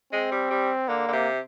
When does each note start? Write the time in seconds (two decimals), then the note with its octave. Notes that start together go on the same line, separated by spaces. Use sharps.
0.13 G#3 C4
0.31 G3
0.51 G3
0.88 D3 A#3
1.08 D3
1.13 C3